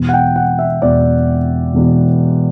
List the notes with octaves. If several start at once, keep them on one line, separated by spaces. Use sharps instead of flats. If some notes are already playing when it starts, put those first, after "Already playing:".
Already playing: E1 E2 B2
F#5
G5
F#5
E5
E1 E2 B2 D5
E1 E2 B2